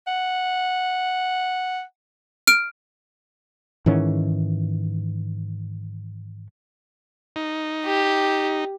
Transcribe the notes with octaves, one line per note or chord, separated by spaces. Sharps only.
F#5
F6 D7
G#2 D#3 E3 C#4
D#4
G4